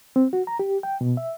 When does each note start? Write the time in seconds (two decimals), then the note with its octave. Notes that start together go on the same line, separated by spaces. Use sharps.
0.16 C4
0.33 F#4
0.47 A#5
0.59 G4
0.83 G5
1.01 B2
1.17 E5